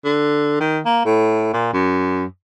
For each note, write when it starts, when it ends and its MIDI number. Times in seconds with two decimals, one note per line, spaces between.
0.05 0.58 50
0.60 0.80 51
0.85 1.03 58
1.05 1.52 45
1.53 1.69 46
1.73 2.25 42